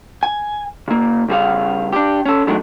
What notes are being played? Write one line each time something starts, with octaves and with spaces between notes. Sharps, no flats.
G#5
C#3 A#3
C#3 G3 G#4 F5
D4 G4
C#4 A4
B1 D#3 F#3 G#3 A3 D4